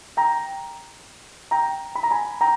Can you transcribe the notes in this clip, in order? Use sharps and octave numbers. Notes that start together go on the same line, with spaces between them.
G5 A#5
G5 A#5
B5
A#5
G#5 B5
G5 A#5